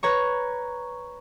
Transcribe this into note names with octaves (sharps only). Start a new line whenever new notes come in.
B4 C#5 A#5 C#6